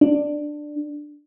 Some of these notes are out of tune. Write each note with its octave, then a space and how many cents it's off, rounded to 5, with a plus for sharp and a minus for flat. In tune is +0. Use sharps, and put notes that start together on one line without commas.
D4 +10